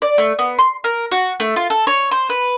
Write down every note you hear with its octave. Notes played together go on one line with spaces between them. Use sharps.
D5
A3
B3
C6
A#4
F#4
A3
F4
A4
C#5
C5
B4